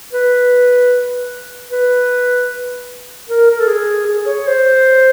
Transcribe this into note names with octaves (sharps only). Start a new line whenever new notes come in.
B4
B4
A#4
A#4
A4
G#4
G#4
C#5
C5